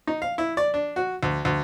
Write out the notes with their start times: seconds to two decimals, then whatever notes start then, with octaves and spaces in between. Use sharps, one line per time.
0.07 D#4
0.22 F5
0.38 E4
0.57 D5
0.74 D4
0.96 F#4
1.23 D2
1.45 D2